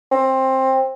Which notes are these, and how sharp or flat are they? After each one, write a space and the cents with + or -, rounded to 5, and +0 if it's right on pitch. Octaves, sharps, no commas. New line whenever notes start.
C4 +15